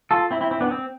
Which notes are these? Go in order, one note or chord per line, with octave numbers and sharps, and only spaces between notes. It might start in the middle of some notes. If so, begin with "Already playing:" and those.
F4 A4
C4 E4
C4 E4
C4 E4
B3 D4
C4